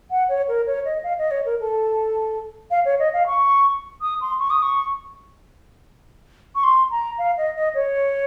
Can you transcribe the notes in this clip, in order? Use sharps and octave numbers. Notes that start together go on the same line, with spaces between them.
F#5
C#5
A#4
C#5
D#5
F5
D#5
C#5
A#4
A4
F5
C#5
D#5
F5
C#6
D#6
C6
C#6
D#6
C#6
C#6
C6
A#5
F5
D#5
D#5
C#5